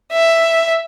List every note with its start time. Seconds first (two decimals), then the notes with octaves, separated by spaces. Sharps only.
0.12 E5